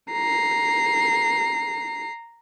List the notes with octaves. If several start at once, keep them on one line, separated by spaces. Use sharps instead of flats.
A#5 C7